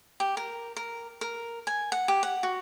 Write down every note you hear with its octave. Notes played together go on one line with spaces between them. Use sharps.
G4
A#4
A#4
A#4
G#5
F#5
G4
F#5
F#4